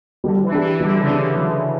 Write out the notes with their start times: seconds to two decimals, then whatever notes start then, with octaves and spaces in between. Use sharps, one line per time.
0.24 D3 G3
0.43 E3
0.52 D4 G4
0.61 E3
0.80 D3 G3
0.99 C#3
1.08 D4 G4
1.18 D3
1.36 F#3